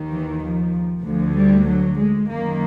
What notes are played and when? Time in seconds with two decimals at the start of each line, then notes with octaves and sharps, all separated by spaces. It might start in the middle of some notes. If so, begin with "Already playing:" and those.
Already playing: D#2 D#3
0.10 E3
0.42 F3
1.03 D2 D3 F3
1.34 G3
1.66 F#3
1.98 G#3
2.28 F#2 D#3 A#3